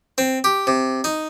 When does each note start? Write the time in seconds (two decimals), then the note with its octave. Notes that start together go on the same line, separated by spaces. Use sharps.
0.18 C4
0.44 G4
0.67 C3
1.04 D#4